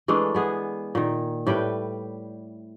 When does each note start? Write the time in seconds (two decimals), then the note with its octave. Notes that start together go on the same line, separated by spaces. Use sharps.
0.08 E3 G#3 A3 D4
0.35 G#3 B3 G#4
0.95 A#2 D#3
1.47 A2 G3 B4 G5